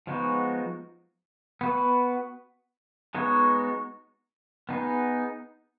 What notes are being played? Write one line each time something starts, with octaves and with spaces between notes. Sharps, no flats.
F3 G#3 B3 D#4 F#4
B3 F#4 B4
G#3 B3 D#4 F#4 C#5
B3 D#4 G#4